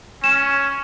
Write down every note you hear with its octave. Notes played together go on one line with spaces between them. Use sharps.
C#4 E7